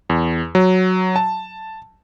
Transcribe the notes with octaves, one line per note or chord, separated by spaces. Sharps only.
E2
F#3
A5